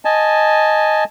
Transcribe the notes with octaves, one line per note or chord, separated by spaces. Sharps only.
D#5 G#5 A5